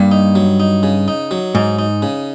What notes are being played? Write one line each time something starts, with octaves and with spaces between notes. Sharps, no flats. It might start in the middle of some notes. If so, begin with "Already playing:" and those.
Already playing: G2 A#3
D#4
F#3
D#4
C#3
D#4
F#3
G#2 D#4
D#4
C#3